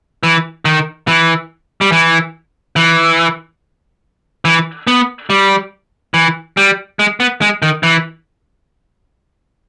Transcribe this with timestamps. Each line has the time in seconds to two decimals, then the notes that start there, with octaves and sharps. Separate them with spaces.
0.23 E3
0.65 D#3
1.07 E3
1.81 G3
1.92 E3
2.76 E3
4.45 E3
4.87 B3
5.30 G3
6.14 E3
6.57 G3
6.99 G#3
7.20 B3
7.41 G#3
7.62 D#3
7.83 E3